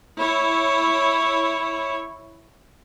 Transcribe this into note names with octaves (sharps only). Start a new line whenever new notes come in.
E4 C#5